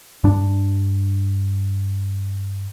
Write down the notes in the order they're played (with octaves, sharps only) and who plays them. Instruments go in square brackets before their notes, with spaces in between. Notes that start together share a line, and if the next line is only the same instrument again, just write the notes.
[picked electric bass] G2 D4